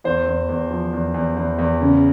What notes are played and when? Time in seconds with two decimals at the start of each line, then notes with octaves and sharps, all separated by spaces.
0.04 E2 C5
0.26 E2
0.49 E2
0.70 F3
0.93 E2
1.14 E2
1.37 E2
1.59 E2
1.81 C#3